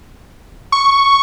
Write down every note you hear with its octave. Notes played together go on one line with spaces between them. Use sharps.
C#6